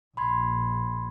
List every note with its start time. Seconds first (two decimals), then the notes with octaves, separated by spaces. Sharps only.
0.17 A#1 B5 C6 G#6